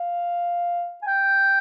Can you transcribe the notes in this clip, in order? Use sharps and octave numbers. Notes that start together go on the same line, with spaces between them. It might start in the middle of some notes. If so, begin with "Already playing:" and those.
Already playing: F5
G#5
G5